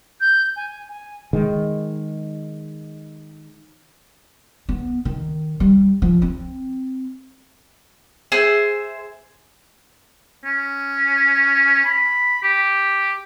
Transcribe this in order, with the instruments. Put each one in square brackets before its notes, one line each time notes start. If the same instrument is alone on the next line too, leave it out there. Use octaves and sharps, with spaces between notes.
[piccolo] G6
G#5
G#5
[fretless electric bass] D#3 G#3
[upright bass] B3
D#3
G3
F3
C4
[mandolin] G#4 C5 E5 E6
[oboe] C#4
B5
G4